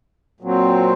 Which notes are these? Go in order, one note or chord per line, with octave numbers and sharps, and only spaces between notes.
A#2 F#3 C4